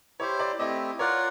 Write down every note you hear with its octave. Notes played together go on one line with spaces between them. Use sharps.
E4 G4 C5 C#5
D5
A3 C4 E4 G4 D#5
F4 A#4 C#5 D5 F#5